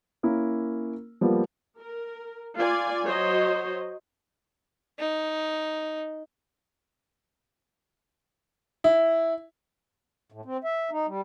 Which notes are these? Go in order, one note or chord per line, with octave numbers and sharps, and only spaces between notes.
A#3 C#4 E4 A#4
F3 G3 A#3 B3
A#4
F4 D5 G#5
F#3 F#4 C5 C#5 D#5
D#4
E4
A2
C4
E5
D#4
G3